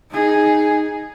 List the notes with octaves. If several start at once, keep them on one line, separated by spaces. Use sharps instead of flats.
D#4 G#4